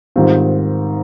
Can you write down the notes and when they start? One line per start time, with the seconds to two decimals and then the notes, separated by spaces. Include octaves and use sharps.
0.16 G#2 D#3 G3 C4 F4